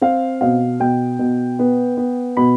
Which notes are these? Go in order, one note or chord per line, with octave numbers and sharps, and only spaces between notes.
C4 F5
B2 F5
B2 G5
B2
B3
B3
B2 B5